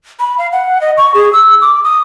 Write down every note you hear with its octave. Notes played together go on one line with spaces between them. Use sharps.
B5
F5
F#5
D#5
C#6
G#4
E6
D6
D#6